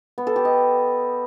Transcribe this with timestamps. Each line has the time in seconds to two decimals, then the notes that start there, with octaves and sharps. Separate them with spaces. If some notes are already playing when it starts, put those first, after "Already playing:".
0.18 B3
0.27 A4
0.36 G4
0.45 D#5